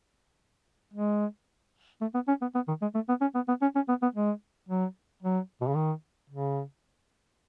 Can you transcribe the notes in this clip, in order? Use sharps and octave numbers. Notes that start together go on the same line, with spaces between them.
G#3
A3
B3
C#4
B3
B3
D#3
G#3
A3
B3
C#4
B3
B3
C#4
C#4
B3
B3
G#3
F#3
F#3
B2
C#3
D#3
C#3